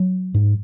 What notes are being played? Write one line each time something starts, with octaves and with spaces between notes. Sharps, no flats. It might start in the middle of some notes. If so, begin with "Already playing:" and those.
Already playing: F#3
G#2